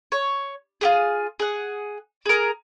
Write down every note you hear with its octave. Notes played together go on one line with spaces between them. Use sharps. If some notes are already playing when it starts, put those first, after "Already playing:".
C#5
F4 G4 G#4
G#4 F#5
G#4 A#4